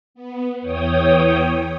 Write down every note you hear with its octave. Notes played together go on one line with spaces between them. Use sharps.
B3
E2 E3 C#5 G5 D#6